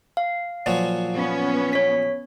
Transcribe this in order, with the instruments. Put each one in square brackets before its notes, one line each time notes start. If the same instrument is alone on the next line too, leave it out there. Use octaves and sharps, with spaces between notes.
[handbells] F5
[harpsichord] A#2 F3 F#3
[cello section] B3 C#4
[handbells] C#5 B6